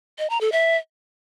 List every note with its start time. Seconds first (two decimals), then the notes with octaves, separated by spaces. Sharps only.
0.19 D#5
0.30 A#5
0.41 A4
0.52 E5